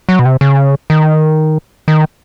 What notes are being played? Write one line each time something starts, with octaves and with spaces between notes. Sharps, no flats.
F#3
B2
C3
C#3
D#3
D#3